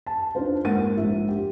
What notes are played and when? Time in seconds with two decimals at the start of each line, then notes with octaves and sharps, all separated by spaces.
0.06 A5
0.35 D4 D#4 F4 C5
0.65 G#2 A#3 F#5 A6 D#7
0.97 A#1 G#2 D4 E5
1.28 G4